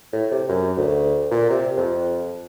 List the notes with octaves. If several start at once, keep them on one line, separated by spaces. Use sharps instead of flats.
A2
C3
F#2
D2
A#2
C3
F2